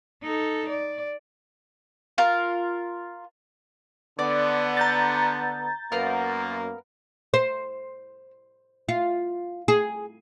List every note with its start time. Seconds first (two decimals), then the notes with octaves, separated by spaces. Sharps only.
0.23 D#4 A4
0.69 D5
2.18 F4 A#4
4.19 D3 B3 D5
4.77 A#5 G6 A6
5.92 F#2 A#3 B3 A#4 F5
7.34 C5
8.89 F4
9.68 G#4